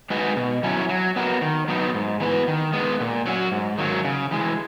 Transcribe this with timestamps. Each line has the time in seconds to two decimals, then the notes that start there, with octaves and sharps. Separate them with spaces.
0.10 G#3 D#4 F#4 B4
0.37 B2
0.63 F#3 C#4 E4
0.89 F#3
1.16 B3 F#4 A#4
1.42 D#3
1.68 F#3 B3 D#4
1.94 G#2
2.20 E3 B3 F#4 B4
2.48 D#3
2.73 G#3 B3
3.00 A#2
3.26 F#3 C#4 F#4
3.52 G#2
3.78 D#3 F#3 A#3
4.04 C#3
4.31 E3 G#3